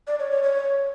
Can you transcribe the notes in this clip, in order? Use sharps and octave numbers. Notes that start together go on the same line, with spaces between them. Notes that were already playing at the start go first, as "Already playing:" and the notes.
D5
C#5
C#5
C#5